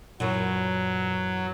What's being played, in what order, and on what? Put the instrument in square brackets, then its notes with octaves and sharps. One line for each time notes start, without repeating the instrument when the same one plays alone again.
[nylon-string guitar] F#2 E3 [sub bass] A#2 [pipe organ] F#3